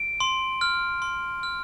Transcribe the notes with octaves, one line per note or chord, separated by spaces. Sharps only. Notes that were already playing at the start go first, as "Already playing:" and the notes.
Already playing: D7
C6
F6
C6
F6